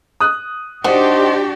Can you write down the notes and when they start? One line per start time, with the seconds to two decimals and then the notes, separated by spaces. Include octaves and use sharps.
0.20 D#6 F#6
0.84 D4 D#4 F#4 G4 C5 F#5